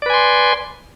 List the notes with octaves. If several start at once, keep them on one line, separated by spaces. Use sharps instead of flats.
B4 D5 G#5 C6